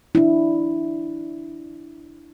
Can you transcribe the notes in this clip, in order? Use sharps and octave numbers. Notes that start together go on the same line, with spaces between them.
D4 E4